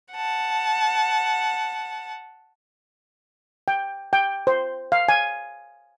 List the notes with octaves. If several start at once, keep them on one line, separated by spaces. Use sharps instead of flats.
F#5 A5
G5
G5
C5
F5
G#5